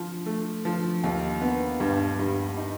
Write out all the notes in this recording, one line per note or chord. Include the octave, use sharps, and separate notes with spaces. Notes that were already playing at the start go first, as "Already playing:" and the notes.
Already playing: F3
A3
F3
D#2
B3
G2
G2
D#4